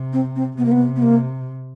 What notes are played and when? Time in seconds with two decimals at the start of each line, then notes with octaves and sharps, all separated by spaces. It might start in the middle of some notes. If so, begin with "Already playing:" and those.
Already playing: C3
0.13 C4
0.36 C4
0.58 C3 B3
0.65 A#3
0.72 B3
0.96 B3
1.02 A#3